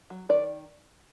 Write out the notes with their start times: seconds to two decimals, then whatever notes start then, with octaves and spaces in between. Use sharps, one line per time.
0.10 F#3
0.29 D#3 D5